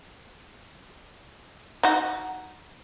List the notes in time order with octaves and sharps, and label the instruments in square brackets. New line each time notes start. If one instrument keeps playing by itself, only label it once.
[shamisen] D#4 F#4